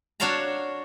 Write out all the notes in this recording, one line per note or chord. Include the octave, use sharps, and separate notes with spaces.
D4 F#4 C#5 F5 A5 A#5